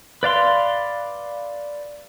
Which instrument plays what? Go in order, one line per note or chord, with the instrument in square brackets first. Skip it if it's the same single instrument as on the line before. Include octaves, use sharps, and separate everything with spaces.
[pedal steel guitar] B4 D5 F5 C6